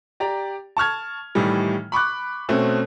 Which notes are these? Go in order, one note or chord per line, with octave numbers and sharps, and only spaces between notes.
G4 D5 A#5
A5 C#6 F6 G#6
A2 D#3 E3 G3
B5 C#6 D6 F#6
B2 A3 C4 C#4